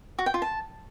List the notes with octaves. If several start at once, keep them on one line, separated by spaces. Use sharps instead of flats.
F#4
G5
F4
A5